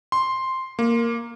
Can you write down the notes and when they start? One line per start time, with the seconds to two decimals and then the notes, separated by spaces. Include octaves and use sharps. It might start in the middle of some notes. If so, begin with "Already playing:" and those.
0.12 C6
0.79 A#3